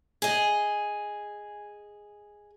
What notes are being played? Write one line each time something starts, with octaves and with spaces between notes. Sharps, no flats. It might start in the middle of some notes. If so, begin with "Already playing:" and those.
G#4 D#5